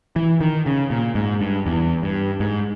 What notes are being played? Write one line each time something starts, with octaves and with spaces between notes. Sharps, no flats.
E3
D#3
C#3
A#2
G#2
G2
E2
G2
G#2